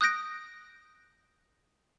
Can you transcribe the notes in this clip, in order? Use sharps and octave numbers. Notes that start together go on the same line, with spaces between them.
D#6 F#6 G6 A#6 D7